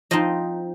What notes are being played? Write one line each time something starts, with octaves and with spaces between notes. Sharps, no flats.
F3 C4 D#4 D#5